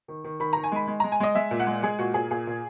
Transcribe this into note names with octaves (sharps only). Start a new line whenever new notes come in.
D#3
D#3
D#3 B5
D#3 A#5
G#5
G#3 B5
G#3
G#3 A#5
G#5
G#3 D#5
G#3 E5
A#2
F#5
G#3
G#3 G#4
A#2 F#4
A#2 G#4
A#2 G#4
A#2